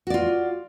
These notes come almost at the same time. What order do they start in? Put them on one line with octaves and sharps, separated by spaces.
F#4 D5 F4